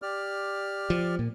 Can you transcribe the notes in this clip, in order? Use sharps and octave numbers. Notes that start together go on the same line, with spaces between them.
G4 D5 F6
F3
A#2